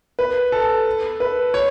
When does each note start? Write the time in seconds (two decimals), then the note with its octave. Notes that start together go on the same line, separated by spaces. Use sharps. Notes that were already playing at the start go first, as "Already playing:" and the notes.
0.19 B4
0.52 A4
1.20 B4
1.54 C#5